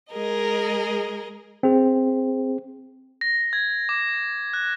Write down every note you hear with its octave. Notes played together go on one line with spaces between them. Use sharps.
G#3 G#4 A#4 D#5
C4 G#4
A#6
G#6
D6
F#6